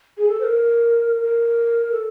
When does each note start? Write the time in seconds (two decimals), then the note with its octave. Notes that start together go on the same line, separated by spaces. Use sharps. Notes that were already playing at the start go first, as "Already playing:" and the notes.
0.18 G#4
0.29 A4
0.40 C5
0.44 A#4
1.22 A#4
1.92 A4